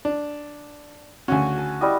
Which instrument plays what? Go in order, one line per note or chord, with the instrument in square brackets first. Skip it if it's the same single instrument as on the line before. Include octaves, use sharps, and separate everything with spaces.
[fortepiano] D4
[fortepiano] D2 C#3 C#4 [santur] F#4 G#5
[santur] A5
G3 E4 D#5